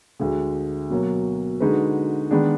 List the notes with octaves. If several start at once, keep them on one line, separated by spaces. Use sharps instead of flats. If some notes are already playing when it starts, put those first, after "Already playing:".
D2 D3 G#3
B2 F#3 A#3
D3 G#3 D#4 F#4 B4
D#3 G#3 B3 D4